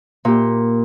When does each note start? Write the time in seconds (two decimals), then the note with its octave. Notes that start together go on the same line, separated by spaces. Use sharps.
0.25 A#2 G4